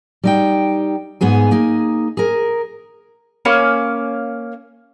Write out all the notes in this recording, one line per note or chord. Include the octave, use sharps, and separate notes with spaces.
G3 D#4 G5
G#2 B3 G#4 G#5
A#3 D#4 G#4
G#4 A#4
A#3 C#4 F5 B5